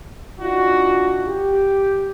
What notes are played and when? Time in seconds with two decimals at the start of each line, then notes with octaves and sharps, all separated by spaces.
0.40 D4 D#4 F4 F#4
1.27 G4